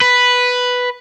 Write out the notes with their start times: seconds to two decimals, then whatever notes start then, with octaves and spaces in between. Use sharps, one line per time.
0.01 B4